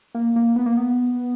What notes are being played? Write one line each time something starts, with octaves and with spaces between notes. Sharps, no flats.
A#3
A#3
B3
A#3
B3